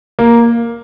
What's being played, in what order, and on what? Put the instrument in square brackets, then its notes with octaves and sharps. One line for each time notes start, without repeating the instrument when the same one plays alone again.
[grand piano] A#3